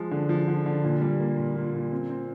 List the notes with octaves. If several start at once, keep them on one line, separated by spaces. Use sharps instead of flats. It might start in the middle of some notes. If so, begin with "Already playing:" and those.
Already playing: F3 G#3
D3
F3
D3
D3
A#2
G3
A#3
A#2
A#2
A#2
C4
C4